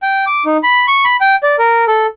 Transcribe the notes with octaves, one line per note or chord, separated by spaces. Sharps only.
G5
D6
D#4
B5
C#6
B5
G5
D5
A#4
A4